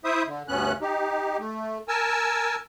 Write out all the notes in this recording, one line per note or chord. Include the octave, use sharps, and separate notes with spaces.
E4 C5 E5 D#6
D3
D2 G2 B3 C#4 F#6
D#4 G4
A3
A#4 G#5 A5 E6